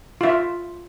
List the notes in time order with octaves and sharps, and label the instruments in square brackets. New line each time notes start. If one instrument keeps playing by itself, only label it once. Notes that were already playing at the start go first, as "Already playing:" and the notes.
[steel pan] F4 E5